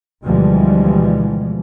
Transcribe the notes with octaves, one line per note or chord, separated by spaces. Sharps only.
D2 B2 E3 F3 G3 G#3